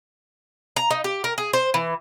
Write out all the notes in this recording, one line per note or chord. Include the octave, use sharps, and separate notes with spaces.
A#5
D#4
G4
A#4
G#4
C5
E3